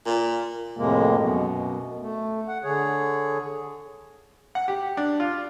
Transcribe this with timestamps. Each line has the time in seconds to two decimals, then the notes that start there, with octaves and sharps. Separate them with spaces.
0.06 A#2
0.77 F2 A2 C3 G#3 A#3
1.17 F#2 B2
2.01 A3
2.48 F#5
2.63 D3 G#4 C#5
4.55 F#5
4.68 G4
4.97 D4
5.20 F4